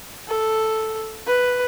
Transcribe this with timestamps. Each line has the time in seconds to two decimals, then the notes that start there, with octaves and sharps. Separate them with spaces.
0.28 A4
1.27 B4